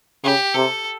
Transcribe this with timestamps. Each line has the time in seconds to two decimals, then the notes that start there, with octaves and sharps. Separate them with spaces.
0.24 C#3 G4
0.55 C3 A4